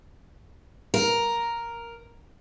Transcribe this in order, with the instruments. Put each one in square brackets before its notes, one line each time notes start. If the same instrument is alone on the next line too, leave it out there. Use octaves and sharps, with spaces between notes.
[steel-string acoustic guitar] A#4